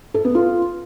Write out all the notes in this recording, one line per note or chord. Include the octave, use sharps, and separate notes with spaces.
A4
B3
F4